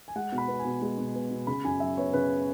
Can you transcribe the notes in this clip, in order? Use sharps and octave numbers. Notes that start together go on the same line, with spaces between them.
G#5
G#3 F#5
B2
B5
B3
G#5
B2
G#3
B2
B3
B2
C#3 B5
F#2 G#5
F#3 E5
B3 C#5
C#3 B4